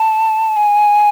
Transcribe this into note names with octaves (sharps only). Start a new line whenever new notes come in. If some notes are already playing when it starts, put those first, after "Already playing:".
Already playing: A5
G#5